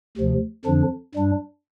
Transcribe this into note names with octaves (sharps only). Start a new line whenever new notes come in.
D2 C3 F3
F2 D3 F3 D4
G2 G3 D4